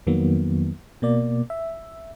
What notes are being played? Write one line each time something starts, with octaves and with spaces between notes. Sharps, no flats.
F2 D#3 F#3 A#3 B3
B2 A#3 D5
E5